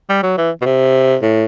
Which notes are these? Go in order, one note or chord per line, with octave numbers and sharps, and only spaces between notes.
G3
F#3
E3
B2
C3
A2